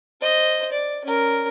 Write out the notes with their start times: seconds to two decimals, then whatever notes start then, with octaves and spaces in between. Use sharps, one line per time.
0.21 C5 D#5
0.72 D5
1.05 C#4 A#4